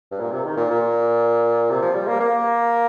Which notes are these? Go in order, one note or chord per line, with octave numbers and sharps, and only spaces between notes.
G2
A#2
C3
D#3
A#2
A#2
C3
F3
G3
A#3
A#3